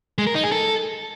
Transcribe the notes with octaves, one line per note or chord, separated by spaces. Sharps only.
G#3
A#4
D#4
G#4
A4